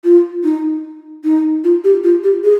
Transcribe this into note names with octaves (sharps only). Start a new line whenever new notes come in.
F4
D#4
D#4
F4
G4
F4
G4
G#4